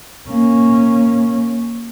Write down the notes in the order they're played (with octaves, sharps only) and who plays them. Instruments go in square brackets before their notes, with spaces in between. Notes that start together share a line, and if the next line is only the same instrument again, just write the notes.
[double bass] A#3 C#4